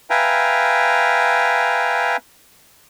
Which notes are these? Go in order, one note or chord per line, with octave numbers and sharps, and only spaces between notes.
B4 E5 F5 G5 G#5 A#5